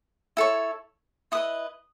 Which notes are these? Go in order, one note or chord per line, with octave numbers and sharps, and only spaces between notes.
E4 A4 C#5
E4 B4 D#5 D#6